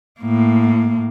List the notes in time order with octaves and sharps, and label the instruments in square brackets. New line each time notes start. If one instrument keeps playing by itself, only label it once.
[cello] A2 A#3